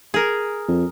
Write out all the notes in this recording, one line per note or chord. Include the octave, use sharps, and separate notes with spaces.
G#4 A#4
F2